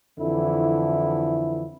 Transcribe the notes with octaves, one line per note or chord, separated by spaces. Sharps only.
F2 D3 E3 E4